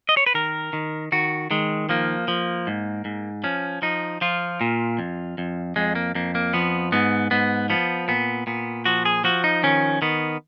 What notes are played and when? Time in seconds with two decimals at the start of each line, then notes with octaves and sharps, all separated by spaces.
0.09 D#5
0.17 C#5
0.26 B4
0.34 D#3 A#4
0.73 D#3
1.12 D#3 F#4
1.51 D#3 G#3
1.89 F3 A#3
2.28 F3
2.67 G#2
3.05 G#2
3.44 F3 C#4
3.82 F3 D#4
4.21 F3 F4
4.61 A#2
4.99 F2
5.38 F2
5.76 F2 G#3
5.95 A#3
6.15 F2 A#3
6.35 A#3
6.54 F3 B3
6.92 G#2 B3
7.31 G#2 B3
7.70 F3 B3
8.08 A#2 B3
8.47 A#2 B3
8.86 F3 F#4
9.05 G#4
9.24 F3 F#4
9.44 D#4
9.63 D#3 C#4
10.02 D#3 B3